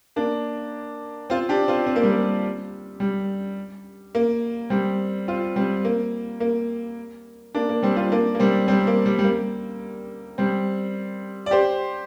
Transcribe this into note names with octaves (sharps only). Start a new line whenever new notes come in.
A#3 D4
C4 F4
D4 G4
C4 F4
C4
A#3
G3
A#3
G3
A#3
G3 C4
C4 F4
G3 C4
A#3
A#3
A#3 D4
A#3
G3 C4
C4 F4
A#3 D4
A#3
G3 C4
G3 C4
A#3
G3
G3
A#3
G3 C4
D5
G4 C5